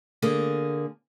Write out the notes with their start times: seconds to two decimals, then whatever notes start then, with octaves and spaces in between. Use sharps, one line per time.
0.22 D3 A#3 G#4